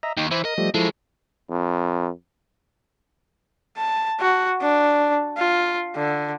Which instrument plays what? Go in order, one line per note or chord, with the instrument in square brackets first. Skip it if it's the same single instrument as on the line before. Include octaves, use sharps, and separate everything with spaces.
[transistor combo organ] D#5 E5 A#5
[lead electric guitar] D#2 [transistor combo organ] D#4 G5
[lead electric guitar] E3 [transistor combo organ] C5 E5
[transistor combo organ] A#4 [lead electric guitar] D#5
[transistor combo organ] F3 G3 A3
[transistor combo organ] F3 E4 A4 [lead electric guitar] F#3 G#3
[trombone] F2
[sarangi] A5
F#4
D4
F4
D3